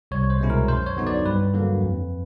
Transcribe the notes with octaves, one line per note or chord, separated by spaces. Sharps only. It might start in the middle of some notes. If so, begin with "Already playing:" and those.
C2 C#5
C5
B2 G#3 C#4 E4
A#4
F#2 C5
C#5
D3 F#3 B3 D#4
D5
G2 B4
D3 F#3 A#3
F2